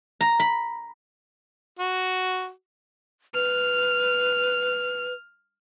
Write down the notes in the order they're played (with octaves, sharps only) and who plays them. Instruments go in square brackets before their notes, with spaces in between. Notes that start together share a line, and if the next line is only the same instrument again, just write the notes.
[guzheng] A#5
B5
[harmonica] F#4
[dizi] B4 [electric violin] F6